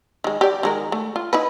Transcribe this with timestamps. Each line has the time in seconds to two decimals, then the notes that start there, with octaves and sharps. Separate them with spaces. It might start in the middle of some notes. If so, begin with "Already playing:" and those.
0.24 D#3 G#3
0.41 G4 D5
0.63 D#3 G#3 A#4
0.92 A3
1.16 F4
1.33 D#4 E4 B4